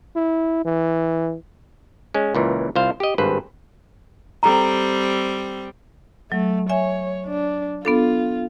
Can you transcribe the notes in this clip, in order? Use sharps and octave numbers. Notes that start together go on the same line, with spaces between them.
E4
E3
G#3 C#4
C#2 A#2 E3
C2 F4 C5 F5
G4 D#5
G#1 G2 B4 C5
G3 C4 A4 A#5
F#3 A3
C#5 E5 G#5
D4
B3 D4 F4 A4